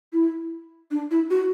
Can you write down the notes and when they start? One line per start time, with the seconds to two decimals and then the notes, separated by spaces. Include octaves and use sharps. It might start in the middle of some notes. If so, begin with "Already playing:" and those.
0.13 E4
0.91 D4
1.11 E4
1.31 F#4